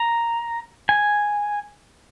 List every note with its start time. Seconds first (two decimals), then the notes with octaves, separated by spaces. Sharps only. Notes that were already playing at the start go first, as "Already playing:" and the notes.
Already playing: A#5
0.89 G#5